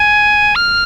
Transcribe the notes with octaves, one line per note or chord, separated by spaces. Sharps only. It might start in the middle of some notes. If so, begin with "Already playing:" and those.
Already playing: G#5
F6